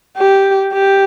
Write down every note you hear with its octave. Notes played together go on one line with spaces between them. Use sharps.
G4
G4